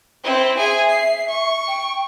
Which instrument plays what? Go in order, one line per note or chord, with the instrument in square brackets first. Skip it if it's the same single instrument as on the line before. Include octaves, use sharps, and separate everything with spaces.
[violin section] C4 E4
[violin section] G#4 G#5 [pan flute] E5
[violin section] C7
C#6
[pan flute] G5